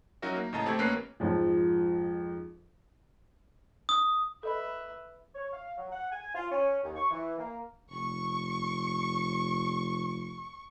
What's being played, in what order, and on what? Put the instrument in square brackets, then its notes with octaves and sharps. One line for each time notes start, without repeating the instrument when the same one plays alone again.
[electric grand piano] F#3 C#4 D#4 F#4 A#4 E5
A#3
A2 C#3 D#5 A5 A#5
A3 C4 G4 A4 A5 G#6
A1 A#3 C#4 B4 F#6 C7
[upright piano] F2 G#2 F3
[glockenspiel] D#6
[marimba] A4 D#5 B5 [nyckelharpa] B4 E5
[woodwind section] C#5
F5
F#3
F#5
G#5
F4
C#4
D#2
C#6
E3
A#3
[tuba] F1 [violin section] C#6